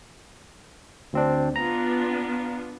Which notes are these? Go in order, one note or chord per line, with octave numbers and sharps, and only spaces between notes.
D2 C4 D4
B3 D4 F4 A#5